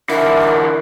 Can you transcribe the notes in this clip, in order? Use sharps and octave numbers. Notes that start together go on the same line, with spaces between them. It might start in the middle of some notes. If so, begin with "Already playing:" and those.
D3 E3 E4 A#4